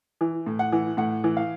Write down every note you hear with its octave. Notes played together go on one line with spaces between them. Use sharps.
E3
A2
F#5
E3
A2 F#5
E3
F5